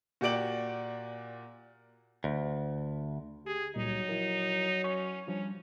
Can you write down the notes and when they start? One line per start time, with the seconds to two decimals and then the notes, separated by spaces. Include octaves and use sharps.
0.21 A#2 F#4 G4 D5 D7 F#7
2.24 D2
3.46 G4 G#4
3.76 C#2 A#2 F#3 G3 D#4
4.09 F3 E4 A#4
4.84 C#4 C#6
5.27 F3 G3 C#4 D4